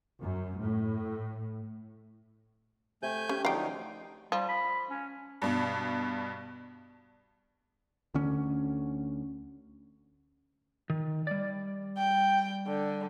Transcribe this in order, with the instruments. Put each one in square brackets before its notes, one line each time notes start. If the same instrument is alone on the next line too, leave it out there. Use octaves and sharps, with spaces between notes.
[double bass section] F#2
A2
[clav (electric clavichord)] C3 [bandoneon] A3 G#5 G6
[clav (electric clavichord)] C4 [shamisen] C#4 [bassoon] G4
[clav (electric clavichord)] D3 F#3 C4 [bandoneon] F3 A3 D#4 [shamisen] F5 G5
[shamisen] F3 [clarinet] G3
[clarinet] B5
C#4
[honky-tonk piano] G2 B2
[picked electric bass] D2 D3 C#4
[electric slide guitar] D#3
G3 D5
[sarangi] G5
D3